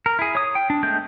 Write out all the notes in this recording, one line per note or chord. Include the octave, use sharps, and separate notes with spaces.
A#4
E4 G#4
C#5 D#6
G5
D4
G#3 A3 B3 G6